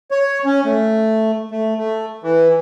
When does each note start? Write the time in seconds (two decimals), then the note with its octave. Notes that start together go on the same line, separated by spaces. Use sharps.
0.11 C#5
0.45 C#4
0.65 A3
1.51 A3
1.78 A3
2.23 E3